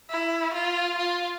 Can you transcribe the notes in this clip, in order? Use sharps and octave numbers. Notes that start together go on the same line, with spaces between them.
E4
F4
F4